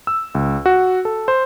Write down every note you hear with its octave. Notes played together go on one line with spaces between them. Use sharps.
E6
C#2
F#4
A4
C5